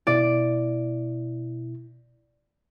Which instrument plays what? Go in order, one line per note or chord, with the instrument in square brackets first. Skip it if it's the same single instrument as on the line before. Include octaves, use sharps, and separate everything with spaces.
[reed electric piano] B2 E4 [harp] D5